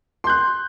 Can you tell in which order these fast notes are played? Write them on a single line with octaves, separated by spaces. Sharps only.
C6 G6 F#6